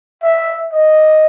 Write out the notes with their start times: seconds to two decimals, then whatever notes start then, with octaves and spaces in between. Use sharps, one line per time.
0.22 E5
0.73 D#5